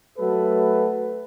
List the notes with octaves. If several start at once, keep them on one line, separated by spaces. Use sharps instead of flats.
F#3 A3 A4 B4